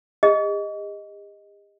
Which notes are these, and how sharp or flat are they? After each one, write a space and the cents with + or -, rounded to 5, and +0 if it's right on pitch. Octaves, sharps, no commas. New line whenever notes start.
G4 +45 D#5 +0